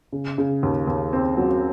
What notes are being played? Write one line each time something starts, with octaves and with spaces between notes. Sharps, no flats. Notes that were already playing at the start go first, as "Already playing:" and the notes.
C#3
C#3
D#2
D#2
C4
F#3